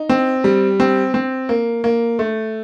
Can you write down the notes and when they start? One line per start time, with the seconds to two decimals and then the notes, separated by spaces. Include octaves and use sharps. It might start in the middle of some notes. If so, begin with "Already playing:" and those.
Already playing: D#4
0.09 C4
0.44 G3
0.80 C4
1.14 C4
1.49 A#3
1.84 A#3
2.19 A3